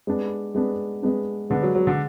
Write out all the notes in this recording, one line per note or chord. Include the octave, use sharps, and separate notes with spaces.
G#3 B3 D4
G#3 B3 D4
G#3 B3 D4
D3 G#3 B3 D4
F#3
F#3
D3